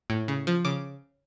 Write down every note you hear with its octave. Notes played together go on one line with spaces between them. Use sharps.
A2
C#3
F3
C#3 D6